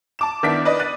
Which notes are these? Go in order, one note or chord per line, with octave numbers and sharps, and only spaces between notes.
A5 D6 E7
D#3 B3 D4 E4 B6 D7
B4 D5 D#5
F#6 A6 D#7